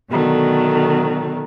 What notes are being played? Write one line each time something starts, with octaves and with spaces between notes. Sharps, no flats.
B2 D3 D#3 F#3 A3